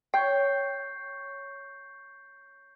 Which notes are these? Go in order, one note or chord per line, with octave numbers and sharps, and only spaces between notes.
C#5 G5 C#6 G6 C7